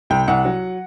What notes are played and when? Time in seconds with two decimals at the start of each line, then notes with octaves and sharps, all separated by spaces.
0.10 C2 G5
0.28 C2 F#5
0.45 F#3